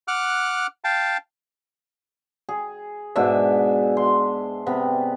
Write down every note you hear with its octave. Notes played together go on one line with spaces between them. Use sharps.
F#5 D6 F6 F#6
F5 G5 A5
G#4
G#2 B2 D4 E5
C6
C3 B3